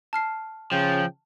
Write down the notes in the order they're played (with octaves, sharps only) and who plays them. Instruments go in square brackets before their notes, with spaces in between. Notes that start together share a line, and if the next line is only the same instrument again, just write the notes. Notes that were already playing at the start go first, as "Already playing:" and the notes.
[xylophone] A5 F6 C7
[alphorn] C#3 [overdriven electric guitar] F3 [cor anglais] G5